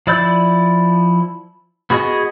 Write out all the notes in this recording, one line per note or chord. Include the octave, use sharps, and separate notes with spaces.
F3 E4 D5 E6 G6
B3 F#4 G#4 D#5